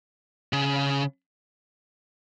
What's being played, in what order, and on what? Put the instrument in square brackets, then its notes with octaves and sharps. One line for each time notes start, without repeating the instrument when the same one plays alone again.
[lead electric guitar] C#3